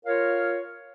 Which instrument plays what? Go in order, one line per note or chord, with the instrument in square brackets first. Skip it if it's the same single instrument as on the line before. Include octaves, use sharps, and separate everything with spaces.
[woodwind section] F4 A#4 C#5 F5